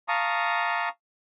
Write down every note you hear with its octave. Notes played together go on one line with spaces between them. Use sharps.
F5 A5 A#5 C#6 D#6